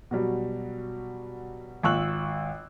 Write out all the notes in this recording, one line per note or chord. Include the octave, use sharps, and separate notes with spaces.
B2 F#3 G3
G#1 F4 C#6 E6 F#6 F#7